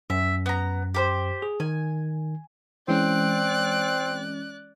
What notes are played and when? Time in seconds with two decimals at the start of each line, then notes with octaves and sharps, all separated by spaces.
0.10 F#2 E5
0.46 B3 A#5
0.94 G4 A#4 C5
1.42 G#4
1.60 D#3 G#5
2.88 E3 G#3 C4 C#4 D5 F#6